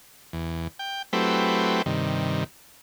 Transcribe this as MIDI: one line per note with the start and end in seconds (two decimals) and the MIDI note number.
0.33 0.68 40
0.79 1.02 79
1.13 1.82 54
1.13 1.82 57
1.13 1.82 60
1.13 1.82 64
1.13 1.82 67
1.13 1.82 71
1.86 2.44 43
1.86 2.44 48
1.86 2.44 51